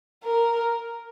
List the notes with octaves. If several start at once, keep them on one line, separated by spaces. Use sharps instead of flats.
A#4